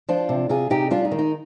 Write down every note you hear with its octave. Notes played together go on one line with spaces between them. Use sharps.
F3 D4 F4
C3
C3 F4 G#4
C3 D#4 G4
G3 D4 F4
D#4
D#3
D#4